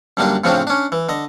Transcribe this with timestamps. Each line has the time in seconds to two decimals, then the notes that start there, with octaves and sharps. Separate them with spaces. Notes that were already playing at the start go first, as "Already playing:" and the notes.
0.17 F#2 D3 G3 A#3 D4
0.44 A2 C#3 F3 C4 D4 F4
0.67 C#4 D4
0.92 E3
1.09 D3 D#5